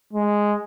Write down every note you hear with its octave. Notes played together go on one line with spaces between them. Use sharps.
G#3